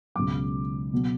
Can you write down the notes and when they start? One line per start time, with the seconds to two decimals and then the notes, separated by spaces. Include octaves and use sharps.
0.15 C#2 B2 F#3 D6
0.93 B2 F#3